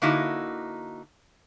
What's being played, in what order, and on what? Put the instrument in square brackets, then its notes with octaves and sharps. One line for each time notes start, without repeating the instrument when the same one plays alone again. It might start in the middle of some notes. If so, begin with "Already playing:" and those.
[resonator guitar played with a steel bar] D3 A#3 D#4 E4 F#4